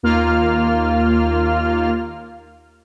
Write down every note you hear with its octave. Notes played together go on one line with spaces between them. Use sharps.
D#2 A#3 F4 F6